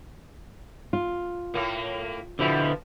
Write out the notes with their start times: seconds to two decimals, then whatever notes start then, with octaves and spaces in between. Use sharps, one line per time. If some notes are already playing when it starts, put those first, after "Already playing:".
0.93 F4
1.54 A2 A#3
2.39 B2 D3 F3 E4